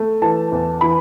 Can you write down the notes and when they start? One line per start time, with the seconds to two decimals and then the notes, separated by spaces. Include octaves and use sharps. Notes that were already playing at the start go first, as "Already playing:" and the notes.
Already playing: A3
0.22 E3 A5
0.52 E2
0.81 E3 B5